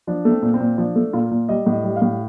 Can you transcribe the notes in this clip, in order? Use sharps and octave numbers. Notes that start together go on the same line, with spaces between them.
F3 D4
A3
C4
A#2
C4
A#2
F3 D4
A3
A#2 F4
A#2
G3 D#5
A2
D#5
G3
F5
A2